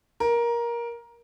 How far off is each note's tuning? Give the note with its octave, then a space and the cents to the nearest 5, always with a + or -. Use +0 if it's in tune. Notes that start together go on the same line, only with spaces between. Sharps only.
A#4 +15